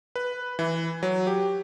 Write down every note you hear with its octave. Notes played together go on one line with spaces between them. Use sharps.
B4
E3
F#3
G4